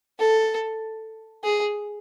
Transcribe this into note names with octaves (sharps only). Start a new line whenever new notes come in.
A4
G#4